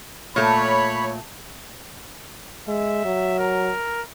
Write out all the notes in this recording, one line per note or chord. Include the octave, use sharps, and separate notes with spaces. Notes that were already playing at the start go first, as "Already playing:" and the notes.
A#2 A3 C#5 B5
G#3 E5
F#3
A#4